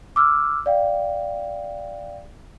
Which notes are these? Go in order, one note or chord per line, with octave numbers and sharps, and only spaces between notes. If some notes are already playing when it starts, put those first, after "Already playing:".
D6 E6 F6
D5 F5 G5